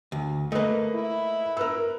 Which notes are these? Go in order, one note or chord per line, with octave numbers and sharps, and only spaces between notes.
D2
A3 A#3 B4 D#5
E4
A#4 B4 E6